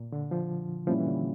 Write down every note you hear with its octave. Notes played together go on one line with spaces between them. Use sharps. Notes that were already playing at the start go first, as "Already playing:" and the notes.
Already playing: A#2
D3
F3
A#2 F3 G3 C#4 E4
E3
D3